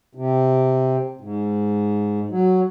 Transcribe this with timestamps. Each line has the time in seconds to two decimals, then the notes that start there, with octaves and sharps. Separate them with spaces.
0.15 C3
1.21 G#2
2.30 F#3